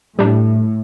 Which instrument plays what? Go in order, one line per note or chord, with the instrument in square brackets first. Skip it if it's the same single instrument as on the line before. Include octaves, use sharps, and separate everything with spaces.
[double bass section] A2 [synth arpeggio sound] G3 D4